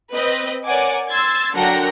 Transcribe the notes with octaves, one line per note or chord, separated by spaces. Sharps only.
C4 B4 D#5
A#4 C#5 D5 F#5 G#5 D6
C6 E6 G#6 A6
D3 F#3 A#4 F#5 G5 A#6